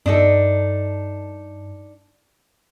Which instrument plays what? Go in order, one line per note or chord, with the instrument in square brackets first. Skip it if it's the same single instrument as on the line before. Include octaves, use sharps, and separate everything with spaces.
[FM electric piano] G2 [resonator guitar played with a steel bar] D4 D#4 A4